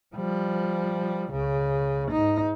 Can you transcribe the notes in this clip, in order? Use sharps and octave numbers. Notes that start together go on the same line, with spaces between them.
F3 G3
C#2 C#3
G#2 D#4